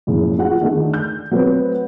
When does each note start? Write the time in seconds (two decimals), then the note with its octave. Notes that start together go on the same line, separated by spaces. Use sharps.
0.07 F#1 F2 A2 C#3
0.38 F4 F#4 G#4 F#5
0.61 D3 D#3 A3 G#4
0.94 G6
1.31 F#3 A3 C4 B4